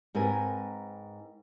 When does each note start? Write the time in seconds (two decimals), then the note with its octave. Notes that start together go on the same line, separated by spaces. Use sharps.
0.15 G#2 C4 A#4 B4 G#5